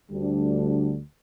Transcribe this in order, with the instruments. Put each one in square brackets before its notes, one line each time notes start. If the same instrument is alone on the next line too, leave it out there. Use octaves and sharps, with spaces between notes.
[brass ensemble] D2 D3 G3 D4